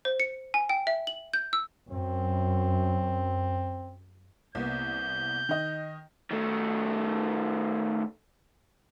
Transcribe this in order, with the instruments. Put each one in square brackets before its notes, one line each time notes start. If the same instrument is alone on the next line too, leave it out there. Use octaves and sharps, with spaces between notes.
[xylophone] C5
C#7
G#5
G5
E5
F#7
G6
E6
[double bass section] F#2 [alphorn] C4
[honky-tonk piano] C2 A#3 B3 [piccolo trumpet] G6
[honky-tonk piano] D#3 D#5
[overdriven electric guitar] D#3 A3